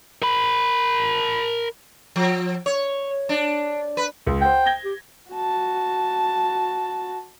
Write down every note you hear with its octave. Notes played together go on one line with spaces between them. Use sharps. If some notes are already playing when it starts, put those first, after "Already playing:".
A#4 B5
F3
C#5
D4
B4
C#2
C5 F#5 G5
G#6 A#6 G7
G4
F#4 A5